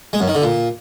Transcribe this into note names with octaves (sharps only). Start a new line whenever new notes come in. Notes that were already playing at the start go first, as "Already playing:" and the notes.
G#3
F#2
D#3
D3
A#2